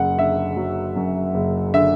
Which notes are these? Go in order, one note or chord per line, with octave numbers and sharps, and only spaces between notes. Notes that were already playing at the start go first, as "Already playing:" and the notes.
Already playing: F#1 F#2 F#5
D3 E5
F#3
F#2
F#1
D3 E5